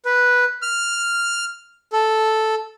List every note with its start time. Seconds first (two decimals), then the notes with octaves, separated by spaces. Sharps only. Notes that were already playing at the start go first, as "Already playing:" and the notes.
0.05 B4
0.62 F6
1.93 A4